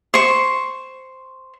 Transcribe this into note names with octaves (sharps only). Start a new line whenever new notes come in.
C5 C#6